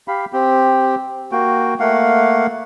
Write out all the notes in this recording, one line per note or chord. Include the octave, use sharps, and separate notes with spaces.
G4 F5 B5
C4 G4
A#3 F#4 G5
A3 A#3 F5 F#5